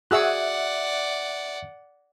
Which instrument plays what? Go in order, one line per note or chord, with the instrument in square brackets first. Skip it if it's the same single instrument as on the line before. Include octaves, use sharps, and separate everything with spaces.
[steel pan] F#4 G#4 E6 [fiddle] D5 F#5 [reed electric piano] E5 F#6